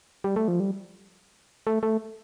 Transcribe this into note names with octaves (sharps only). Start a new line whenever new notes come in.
G3
A3
F3
G3
A3
A3